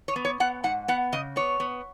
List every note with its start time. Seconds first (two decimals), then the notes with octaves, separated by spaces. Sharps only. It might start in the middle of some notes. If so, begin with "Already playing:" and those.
0.08 C#5
0.16 B3
0.25 C#5
0.40 B3 F#5
0.64 G#2 F#5
0.88 B3 F#5
1.12 C#3 D#5
1.36 B3 C#5
1.60 B3